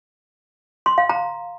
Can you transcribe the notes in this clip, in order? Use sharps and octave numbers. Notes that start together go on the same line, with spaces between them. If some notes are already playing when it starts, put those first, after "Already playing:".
C6
F5
A#5